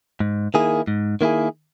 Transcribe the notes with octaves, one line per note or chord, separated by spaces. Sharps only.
G#2
D#3 A#3 E4 G#4
G#2
D#3 A#3 E4 G#4